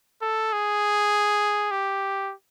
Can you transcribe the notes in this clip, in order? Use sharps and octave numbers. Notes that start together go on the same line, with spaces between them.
A4
G#4
G4